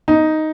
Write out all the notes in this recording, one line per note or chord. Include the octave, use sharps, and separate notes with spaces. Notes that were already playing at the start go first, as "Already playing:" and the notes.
D#4